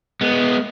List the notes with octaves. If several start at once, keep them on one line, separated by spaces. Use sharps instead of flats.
G#3 B3